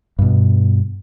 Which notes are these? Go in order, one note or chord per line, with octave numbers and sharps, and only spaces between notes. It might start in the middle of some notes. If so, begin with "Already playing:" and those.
G2 B2